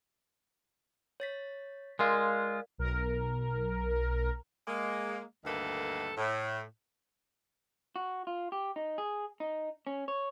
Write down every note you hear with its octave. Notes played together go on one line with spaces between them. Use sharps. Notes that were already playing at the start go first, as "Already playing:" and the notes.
C#5 A6 B6
G#3 F4 A#4 D5 F5
B1 A#4
G#3 A#3
D2 G2 D#3 A#3 A4 B4
A2
F#4
F4
G4
D#4
G#4
D#4
C#4
C#5